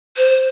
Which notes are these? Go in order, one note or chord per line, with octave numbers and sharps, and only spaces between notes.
C5